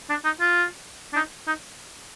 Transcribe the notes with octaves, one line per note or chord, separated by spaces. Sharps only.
D4
D#4
F4
D4
D#4
D#4